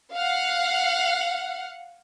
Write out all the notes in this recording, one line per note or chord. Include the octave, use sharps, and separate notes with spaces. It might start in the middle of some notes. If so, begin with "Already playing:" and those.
F5 F#5